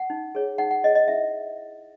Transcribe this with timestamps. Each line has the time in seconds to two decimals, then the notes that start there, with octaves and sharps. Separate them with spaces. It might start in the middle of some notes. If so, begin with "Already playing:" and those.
Already playing: F#5
0.10 D#4
0.35 G#4 C#5
0.58 D#4 F#5
0.71 F#5
0.84 G#4 C#5 D#5
0.95 D#5
1.08 E4 E5